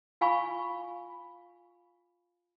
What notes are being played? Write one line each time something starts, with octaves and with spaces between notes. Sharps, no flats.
F4 F5 G#5 B5 C#6